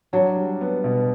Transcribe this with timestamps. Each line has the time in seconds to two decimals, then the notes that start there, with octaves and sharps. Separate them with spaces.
0.13 F#3 D4
0.36 G3
0.61 B3
0.84 B2